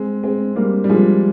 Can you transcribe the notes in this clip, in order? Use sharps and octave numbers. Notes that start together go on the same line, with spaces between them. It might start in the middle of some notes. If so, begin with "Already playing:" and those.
Already playing: G#3 C4
G#3 C4
G3 A#3
G3
F3 G#3